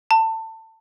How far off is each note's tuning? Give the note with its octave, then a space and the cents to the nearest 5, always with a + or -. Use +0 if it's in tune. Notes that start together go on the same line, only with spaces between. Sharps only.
A5 +25